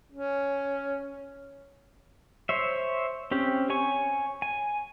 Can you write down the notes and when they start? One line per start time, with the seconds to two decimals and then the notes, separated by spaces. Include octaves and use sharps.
0.12 C#4
2.49 C5 C#5 E5
3.31 C4 C#4 G4
3.70 C#5 G#5 C#6
4.42 G#5